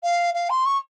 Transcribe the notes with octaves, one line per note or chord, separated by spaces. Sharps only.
F5
F5
C6
C#6